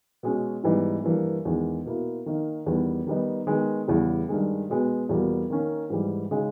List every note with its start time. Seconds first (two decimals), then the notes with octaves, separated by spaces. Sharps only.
0.23 B2 G#3 C#4
0.63 G#2 E3 G3 B3 D#4
1.04 G2 E3 A#3
1.45 E2 D#3 G#3
1.85 B2 A#3 E4
2.26 D#3 A#3 D#4
2.66 E2 D#3 G3 B3
3.06 D#3 G3 B3 D#4
3.47 D#3 G#3 B3
3.88 E2 C#3 E3 G3
4.29 G2 D#3 G#3
4.69 B2 G#3 B3
5.09 E2 B2 G3 A#3
5.50 D#3 A#3 C#4
5.90 G#2 E3 G3
6.31 C#3 G#3 D#4